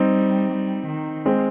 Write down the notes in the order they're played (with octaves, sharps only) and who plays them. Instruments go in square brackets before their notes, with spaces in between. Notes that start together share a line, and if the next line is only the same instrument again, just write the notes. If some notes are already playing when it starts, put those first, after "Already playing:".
Already playing: [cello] G3 [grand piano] C4 D#4
[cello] G3
D#3
[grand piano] G#3 C4